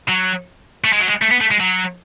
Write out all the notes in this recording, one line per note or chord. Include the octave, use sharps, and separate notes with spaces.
F#3
A3
G#3
F#3
G#3
A3
B3
A3
G#3
F#3